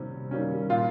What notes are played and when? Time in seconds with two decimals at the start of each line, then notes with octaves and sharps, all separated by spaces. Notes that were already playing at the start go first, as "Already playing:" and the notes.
Already playing: C3 D#3 G3 C#4
0.31 D#3 G3 A#3 C#4
0.70 A#2 F4